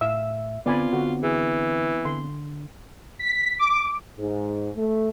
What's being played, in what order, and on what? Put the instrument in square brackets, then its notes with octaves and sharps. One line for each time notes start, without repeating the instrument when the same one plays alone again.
[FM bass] A2 [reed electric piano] E5 [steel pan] F5 E6
[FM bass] D3 [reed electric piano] B3 C4 [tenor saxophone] F4 [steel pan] D5 G#5 B5
[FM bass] D3 [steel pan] F#4
[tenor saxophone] E3 [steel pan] G#4
[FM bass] D3 [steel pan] C6
[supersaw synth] B6
D6
[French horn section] G#2
A3